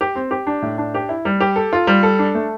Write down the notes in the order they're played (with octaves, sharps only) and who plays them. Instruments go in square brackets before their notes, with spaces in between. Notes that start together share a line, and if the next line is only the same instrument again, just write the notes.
[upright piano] G4
C4
G4
D4
A2
D4
G4
E4
G3
G4
A4
F4
G3
A4
D4
A3